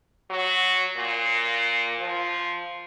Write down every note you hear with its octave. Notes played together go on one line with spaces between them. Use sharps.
F#3
A#2
F3